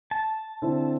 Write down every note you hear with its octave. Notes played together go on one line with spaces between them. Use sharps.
A5
D3 C4 E4